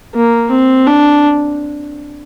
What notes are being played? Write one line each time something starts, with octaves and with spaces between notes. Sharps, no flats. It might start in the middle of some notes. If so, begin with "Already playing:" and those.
A#3
C4
D4